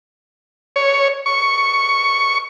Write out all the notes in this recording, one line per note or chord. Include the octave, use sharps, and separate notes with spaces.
C#5
C#6